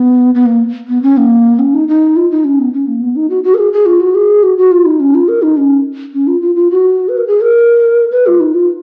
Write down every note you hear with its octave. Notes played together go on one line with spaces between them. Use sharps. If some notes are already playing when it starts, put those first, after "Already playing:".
Already playing: B3
B3
A#3
B3
C#4
A#3
C#4
D#4
D#4
F4
D#4
C#4
B3
C#4
A#3
B3
D#4
F#4
F#4
A#4
G#4
G#4
F4
F#4
G#4
F#4
F#4
F4
D#4
C#4
F4
A#4
D#4
C#4
C#4
F4
F4
F4
F#4
B4
A#4
G#4
A#4
B4
F4
D#4
F4